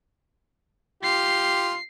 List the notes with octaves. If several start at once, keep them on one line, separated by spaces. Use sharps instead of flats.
F4 G4 C7